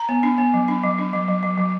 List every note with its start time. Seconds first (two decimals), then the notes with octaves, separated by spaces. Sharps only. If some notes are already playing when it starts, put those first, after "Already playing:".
Already playing: A#5
0.09 B3
0.23 D4
0.38 B3
0.54 F#3
0.68 D4
0.84 F#3
0.99 D4
1.13 F#3
1.28 F#3
1.43 F#3
1.58 F#3